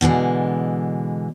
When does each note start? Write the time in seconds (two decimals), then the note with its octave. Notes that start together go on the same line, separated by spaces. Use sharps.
0.01 B2 D3 E3 G#3